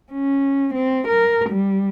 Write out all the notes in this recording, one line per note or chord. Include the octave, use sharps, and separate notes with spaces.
C#4
C4
A#4
G3